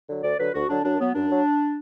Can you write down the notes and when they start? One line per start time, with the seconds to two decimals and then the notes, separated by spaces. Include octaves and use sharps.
0.08 D3 F#3
0.23 D2 D5
0.38 D3 F#3 B4
0.53 D2 F#4
0.68 D3 F#3 D4
0.84 F#2 D4
0.99 F#3 B3
1.15 F#2 D4
1.30 F#3